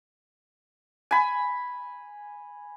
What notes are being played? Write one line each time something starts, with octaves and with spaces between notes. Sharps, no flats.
G#5 B5